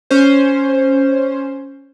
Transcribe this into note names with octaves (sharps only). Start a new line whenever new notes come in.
C#4 C5